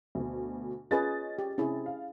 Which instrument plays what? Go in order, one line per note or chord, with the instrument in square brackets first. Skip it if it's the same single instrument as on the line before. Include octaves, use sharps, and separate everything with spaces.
[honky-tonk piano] D2 B2
[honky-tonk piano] C#4 D#5 A6 [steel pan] F4 G#4 B4
[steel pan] G4
[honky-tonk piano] C3 [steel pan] C#4 E4 G#4
[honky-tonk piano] F5